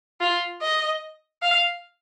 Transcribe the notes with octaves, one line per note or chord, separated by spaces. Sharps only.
F4
D#5
F5